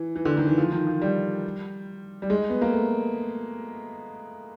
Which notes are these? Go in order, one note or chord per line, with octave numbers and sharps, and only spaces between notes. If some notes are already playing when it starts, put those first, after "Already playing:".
Already playing: E3
E3
D3
D#3
E3
F3
D#3
F3
G3
G3
G#3
B3
A#3
A3